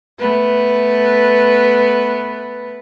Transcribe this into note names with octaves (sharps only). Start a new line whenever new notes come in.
A3 B3 B4